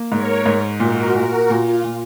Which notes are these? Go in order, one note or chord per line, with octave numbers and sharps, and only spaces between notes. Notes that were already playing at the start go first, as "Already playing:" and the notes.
Already playing: A#3
G#2 A#4 C#5
G#2
A#2 F#4 A#4
A#2 F#4 A#4
A#2 F4
A#2